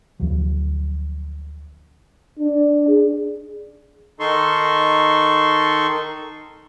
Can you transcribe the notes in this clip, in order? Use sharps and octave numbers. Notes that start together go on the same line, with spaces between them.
D2 F3 F#3
D4
G#4
D#3 D#4 A4 C6 C#6